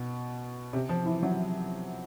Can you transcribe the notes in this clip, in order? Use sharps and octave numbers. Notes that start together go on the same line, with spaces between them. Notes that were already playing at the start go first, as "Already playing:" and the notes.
Already playing: B2
C3
F3
E3
F#3